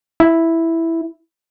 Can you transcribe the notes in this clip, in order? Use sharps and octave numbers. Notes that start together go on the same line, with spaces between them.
E4